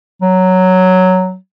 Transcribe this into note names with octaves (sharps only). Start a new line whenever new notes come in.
F#3